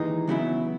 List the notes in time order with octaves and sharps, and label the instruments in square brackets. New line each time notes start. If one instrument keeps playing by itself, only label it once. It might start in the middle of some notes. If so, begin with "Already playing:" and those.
Already playing: [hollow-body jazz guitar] D#2 D#3 G#3 D#4 [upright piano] E3
[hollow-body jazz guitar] F#2 C#3 F#3 B3 E4